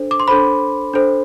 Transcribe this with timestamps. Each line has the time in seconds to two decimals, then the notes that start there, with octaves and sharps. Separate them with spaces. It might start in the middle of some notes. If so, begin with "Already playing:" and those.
Already playing: D4 A4 C5
0.11 D6
0.20 C6
0.28 D4 A4 C5 B5
0.93 D4 A4 C5